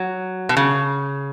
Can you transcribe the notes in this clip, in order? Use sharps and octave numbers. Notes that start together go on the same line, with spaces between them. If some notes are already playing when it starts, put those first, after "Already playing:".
Already playing: F#3
B2
C#3